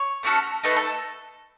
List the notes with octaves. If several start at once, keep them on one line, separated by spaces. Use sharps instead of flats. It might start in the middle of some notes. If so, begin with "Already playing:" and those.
Already playing: C#5
A3 C#4 F#4 A4
A3 D#4 A4 B4
A4